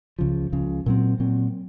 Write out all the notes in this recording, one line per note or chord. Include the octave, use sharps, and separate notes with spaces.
C#2 C#3 F3
C#2 C#3 F3
A#2 F#3 C4
A#2 F#3 C4